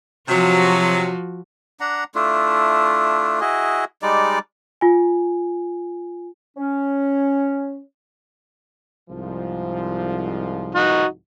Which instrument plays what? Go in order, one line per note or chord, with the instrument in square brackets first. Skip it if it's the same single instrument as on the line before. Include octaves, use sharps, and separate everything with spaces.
[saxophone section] C3 F#3 [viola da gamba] F3 F#4
[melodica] D4 F#5 A#5
A3 D4 E4 F4
E4 F#4 G#4 D#5
G3 G#3 D#4 D5
[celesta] F4 G#5
[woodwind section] C#4
[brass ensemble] C2 G#2 F3
[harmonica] D#4 F#4